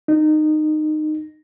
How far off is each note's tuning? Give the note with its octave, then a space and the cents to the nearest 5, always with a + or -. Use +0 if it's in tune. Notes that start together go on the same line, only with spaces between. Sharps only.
D#4 -20